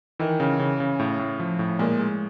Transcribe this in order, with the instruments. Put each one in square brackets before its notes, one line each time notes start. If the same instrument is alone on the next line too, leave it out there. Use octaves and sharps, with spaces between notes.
[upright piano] D#3 [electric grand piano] E3
[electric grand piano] C#3
C#3
C#3
A2
A2
F3
A2
[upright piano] A#2 [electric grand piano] G#3
[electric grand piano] G#3